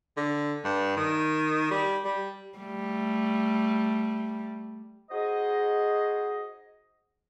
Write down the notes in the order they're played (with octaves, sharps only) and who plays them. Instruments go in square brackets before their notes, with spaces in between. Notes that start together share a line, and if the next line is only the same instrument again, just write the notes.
[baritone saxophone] D3
G2
D#3
G3
G3
[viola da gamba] G3 A3
[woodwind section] D#4 F#4 G#4 C5 D#5